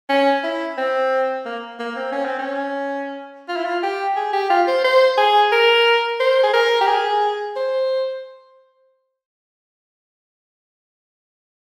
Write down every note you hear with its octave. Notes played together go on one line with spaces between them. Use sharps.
C#4
E4
C4
A#3
A#3
C4
C#4
C4
C#4
F4
E4
F4
G4
G#4
G4
F4
C5
C5
G#4
A#4
C5
G#4
A#4
G4
G#4
C5